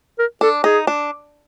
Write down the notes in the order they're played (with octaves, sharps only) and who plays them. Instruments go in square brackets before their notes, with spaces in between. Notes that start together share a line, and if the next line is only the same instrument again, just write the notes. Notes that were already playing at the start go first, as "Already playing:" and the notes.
[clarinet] A#4
[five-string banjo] D4 [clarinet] A4
[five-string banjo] D#4 [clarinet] G#4
[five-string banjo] D4